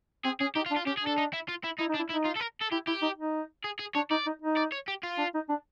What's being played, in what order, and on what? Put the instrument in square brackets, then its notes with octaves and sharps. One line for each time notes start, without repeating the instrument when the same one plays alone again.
[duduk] C4 [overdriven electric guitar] G#4
[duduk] C#4 [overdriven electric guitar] G#4
[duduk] D#4 [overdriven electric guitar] G4
[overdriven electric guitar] F4
[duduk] D4
[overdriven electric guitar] F4
[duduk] C#4 [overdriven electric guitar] G4
[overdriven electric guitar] G#4
[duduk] D4 [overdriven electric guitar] A4
[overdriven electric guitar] D#4
E4
F4
E4
[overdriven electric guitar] D#4 [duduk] E4
[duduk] D#4
[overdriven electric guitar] D4
[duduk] E4
[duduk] D#4 [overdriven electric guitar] E4
[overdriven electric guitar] F4
A4
A#4
A4
[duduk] E4 [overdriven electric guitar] G4
[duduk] E4 [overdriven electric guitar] G4
[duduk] D#4
D#4
[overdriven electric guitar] G#4
G#4
[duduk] D4 [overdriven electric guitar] C#5
[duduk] D#4 [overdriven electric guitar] D5
[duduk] D#4
D#4
[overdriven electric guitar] D5
C#5
G4
F4
[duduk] D4
D#4
D4